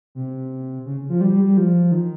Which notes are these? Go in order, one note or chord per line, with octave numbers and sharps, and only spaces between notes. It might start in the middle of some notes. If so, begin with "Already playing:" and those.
C3
C#3
F3
G3
G3
G3
F3
D#3